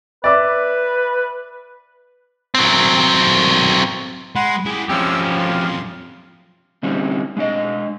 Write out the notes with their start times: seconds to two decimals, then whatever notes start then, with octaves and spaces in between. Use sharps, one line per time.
0.24 B4 D5 E5 D6
2.55 F#3 C4
4.36 G#3 F#5 B5 C6
4.66 E4 G4 G#4
4.89 F2 C#3 F3 C#4 G4 G5 E6
5.40 C6
6.83 D3 G3 C4 C#4 G4
7.37 G#3 D4 D#5